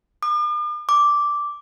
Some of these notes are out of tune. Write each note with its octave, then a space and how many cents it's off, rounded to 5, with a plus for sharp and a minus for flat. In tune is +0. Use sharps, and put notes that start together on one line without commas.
D6 +45
D6 -5